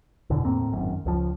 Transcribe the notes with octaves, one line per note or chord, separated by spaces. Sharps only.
E2 B2 D3
E2 A2 A#3 C4
G#1 F#2
C#2 F3